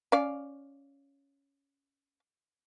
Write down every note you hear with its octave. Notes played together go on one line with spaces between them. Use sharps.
C#4 D5 F5